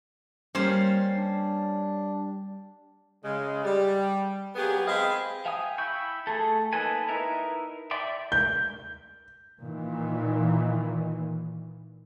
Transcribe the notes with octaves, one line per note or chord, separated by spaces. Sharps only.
G3 A#3 C#4 C5
D4
C#3 G#3
G3
F#3 A#3 B3 G4 G#4
G#3 C4 D#5 F5 G5 B5
E5 F5 G5 G#5 D#6
E4 G5 B5 C#6 G6
A3 G#4 A4
A#3 D#4 A4 B4 G#5
D#4 E4 A#4 B4
D5 E5 G5 C6 D6
G6
A#2 D#3 E3